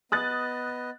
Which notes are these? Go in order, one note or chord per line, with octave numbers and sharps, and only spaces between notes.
B3 D#5 D#6 F#6 A6